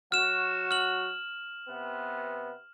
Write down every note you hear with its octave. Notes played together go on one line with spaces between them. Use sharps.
F#3 F#4 F6 E7
F6 F#7
C3 B3